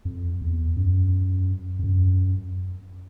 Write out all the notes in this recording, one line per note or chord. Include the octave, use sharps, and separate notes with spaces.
F2
E2
F#2
F2
F#2